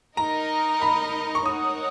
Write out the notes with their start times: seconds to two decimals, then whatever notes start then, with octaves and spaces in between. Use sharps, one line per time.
0.17 D#4 A#4 D#5 A#5
0.82 B5
1.35 C#6
1.46 D#4 A#4 C#5 F#5 D#6